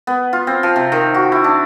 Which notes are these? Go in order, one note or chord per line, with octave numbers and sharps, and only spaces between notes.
B3
F4
C4
F3
C3
D#3
F#4
E4
D4